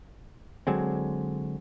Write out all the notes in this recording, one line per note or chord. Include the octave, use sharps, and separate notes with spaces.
D3 F#3 G#3 C4